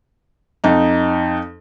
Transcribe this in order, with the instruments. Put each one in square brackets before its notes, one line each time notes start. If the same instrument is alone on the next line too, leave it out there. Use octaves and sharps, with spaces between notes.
[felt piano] F2 D#4